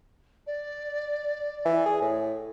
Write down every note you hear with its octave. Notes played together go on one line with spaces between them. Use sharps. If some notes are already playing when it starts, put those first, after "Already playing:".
D5
E3
G#4
A2